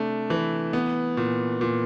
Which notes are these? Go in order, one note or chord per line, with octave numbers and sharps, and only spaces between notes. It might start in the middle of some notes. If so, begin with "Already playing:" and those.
Already playing: C3 A3 D4
E3
B3
A#2
A#2